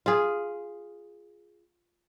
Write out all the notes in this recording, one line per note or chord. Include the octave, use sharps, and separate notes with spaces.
F4 G#4